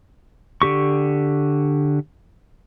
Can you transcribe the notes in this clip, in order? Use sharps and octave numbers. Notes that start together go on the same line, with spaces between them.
D3 G4 C#6